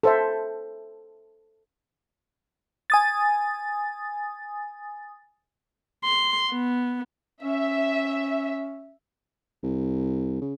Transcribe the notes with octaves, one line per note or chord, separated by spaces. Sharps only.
A4 C5 E5
G#5 D#6 A6
C6
B3
C#4 E5
C2
C#3